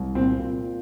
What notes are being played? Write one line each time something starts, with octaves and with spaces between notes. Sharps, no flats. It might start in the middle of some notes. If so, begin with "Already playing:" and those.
Already playing: C2
A#2 C4
A#2